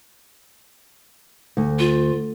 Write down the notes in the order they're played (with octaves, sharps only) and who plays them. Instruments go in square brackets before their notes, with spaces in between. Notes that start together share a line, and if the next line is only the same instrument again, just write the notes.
[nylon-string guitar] D2
[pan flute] F4